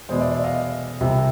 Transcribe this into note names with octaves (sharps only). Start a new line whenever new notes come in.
E2 B2 G#3 C5 D5
D5 E5
D5 E5
D#5 F5
C2 C3 F3